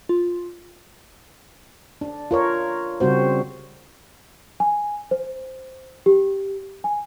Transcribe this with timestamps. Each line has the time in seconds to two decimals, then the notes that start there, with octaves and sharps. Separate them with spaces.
0.09 F4
2.01 D4
2.31 F4 A#4 C#5
3.00 C#3 G3 C4 F#4 C5
4.60 G#5
5.11 C5
6.06 G4
6.84 G#5